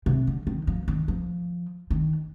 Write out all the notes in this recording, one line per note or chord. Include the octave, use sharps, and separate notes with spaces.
C3
D3
D#3
F3
D#3
F3
D#3